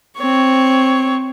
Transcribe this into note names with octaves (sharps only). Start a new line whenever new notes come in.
C4 C#5